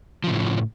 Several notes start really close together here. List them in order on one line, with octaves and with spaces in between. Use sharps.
F3 C#3 A2